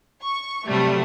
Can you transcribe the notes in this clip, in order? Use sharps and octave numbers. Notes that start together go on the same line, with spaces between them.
C#6
C3 F#3 G3 A3